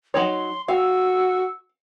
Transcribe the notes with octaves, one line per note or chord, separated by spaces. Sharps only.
F#3 D#4 C#5 C6
F#4 F5 E6